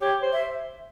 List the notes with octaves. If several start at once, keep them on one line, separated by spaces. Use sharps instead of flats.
G4 C#5
C5
E5